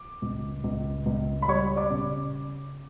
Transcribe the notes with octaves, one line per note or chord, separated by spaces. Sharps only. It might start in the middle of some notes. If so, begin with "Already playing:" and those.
Already playing: D6
C#2
C#2
C#2
B5
G3 C#5 C#6
D5 D6
C#3